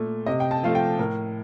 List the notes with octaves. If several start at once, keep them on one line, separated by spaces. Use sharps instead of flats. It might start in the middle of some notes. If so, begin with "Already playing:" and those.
Already playing: A#2 A3
C3 D#5
G5
A5
F3 A3 F5
G5
A2 A#4